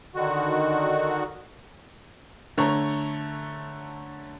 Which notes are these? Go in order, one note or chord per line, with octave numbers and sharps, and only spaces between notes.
D3 D#3 F#4
D3 A3 C#5 A#5 C#6